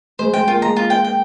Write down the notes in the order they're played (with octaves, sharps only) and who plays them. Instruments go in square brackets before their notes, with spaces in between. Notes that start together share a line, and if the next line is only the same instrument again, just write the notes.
[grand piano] G#3 [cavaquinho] C5
[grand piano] G#3 [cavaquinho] G5
[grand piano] A#3 [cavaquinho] F4
[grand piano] G#3 [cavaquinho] A#5
[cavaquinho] F4
G5
G5